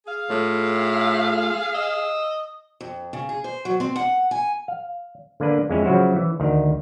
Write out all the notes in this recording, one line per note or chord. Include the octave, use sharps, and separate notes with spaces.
G#4 F5
A2 A3 F4
D#5 E6
F2
C#3
G#4
C5
F#3
C4
F#5
G#5
F5
D3 A#3 D4 B4
F2 G#3 C#4 E4
C#3 F3 F#3 E4 F#4 C5
E3
D2 D#3